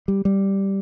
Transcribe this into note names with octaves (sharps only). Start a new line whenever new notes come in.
G3
G3